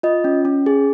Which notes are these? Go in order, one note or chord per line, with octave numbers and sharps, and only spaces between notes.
F4 D#5
C#4
C#4
G#4